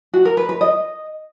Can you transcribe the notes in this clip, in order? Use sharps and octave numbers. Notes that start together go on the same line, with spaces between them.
F#4
A#4
B4
B4
D#5